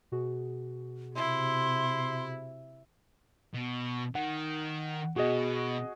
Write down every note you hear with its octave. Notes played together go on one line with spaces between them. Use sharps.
B2 F#4 G#4
C3 E4 C6
B2
D#3 F#5
B2 F#4 G#4 D#5